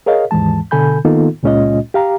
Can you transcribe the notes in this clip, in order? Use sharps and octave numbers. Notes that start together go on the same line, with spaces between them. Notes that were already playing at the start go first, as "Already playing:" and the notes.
G#4 A#4 C#5 D#5 F5
D#2 G#2 E3 G#3 A5
B2 D3 A4 G#5 B5 G6
D#3 A#3 B3 D#4 F4 A4
C#2 A#2 G#3 C#4 F4 D#5
G4 F5 A#5